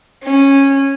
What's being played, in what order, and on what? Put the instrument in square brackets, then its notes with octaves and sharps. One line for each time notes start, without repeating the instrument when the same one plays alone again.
[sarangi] C#4